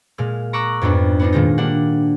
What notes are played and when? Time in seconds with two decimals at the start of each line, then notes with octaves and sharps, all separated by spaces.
0.18 A#2 G#3 F6
0.53 A#5 C#6 D6 E6 F#6
0.81 F2 G#2 B3 D4
1.19 B3 D4 D#4
1.32 A#2 D#3 G#3 D#4
1.58 G3 A#3 D4 F#5